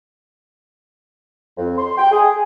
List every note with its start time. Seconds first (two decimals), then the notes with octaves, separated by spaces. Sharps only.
1.57 F2
1.78 C6
1.98 G5
2.12 G#4